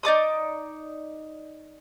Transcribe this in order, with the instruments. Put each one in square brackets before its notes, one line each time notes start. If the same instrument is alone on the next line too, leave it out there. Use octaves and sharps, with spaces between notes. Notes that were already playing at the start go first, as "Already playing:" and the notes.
[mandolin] D#4 D5 D6 D#6